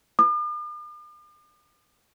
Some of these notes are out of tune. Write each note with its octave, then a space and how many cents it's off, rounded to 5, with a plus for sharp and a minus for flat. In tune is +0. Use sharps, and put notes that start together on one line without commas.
D6 +45